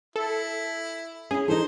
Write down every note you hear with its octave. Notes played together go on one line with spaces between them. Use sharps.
E4 A4
C#4 E4 G#4
E3 D#4 A4 C5